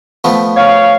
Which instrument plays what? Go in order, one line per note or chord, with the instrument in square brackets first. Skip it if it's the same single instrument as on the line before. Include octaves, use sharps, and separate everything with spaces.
[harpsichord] F3 A3 B3
[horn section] C#5 F5